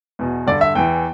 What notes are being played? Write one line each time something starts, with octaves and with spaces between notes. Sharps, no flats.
E2 B2
G2 D3 D5
E5
E2 E3 G5